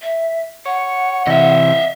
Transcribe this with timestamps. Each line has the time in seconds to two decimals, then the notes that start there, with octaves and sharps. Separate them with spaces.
0.01 E5
0.66 C#5 F#5
1.27 C3 E3 D#5 E5